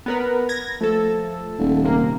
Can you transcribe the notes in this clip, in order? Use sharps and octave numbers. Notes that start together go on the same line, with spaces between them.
B3 A#4 B4
G#6 A#6
F3 A3 A4
D#1
C3 A#3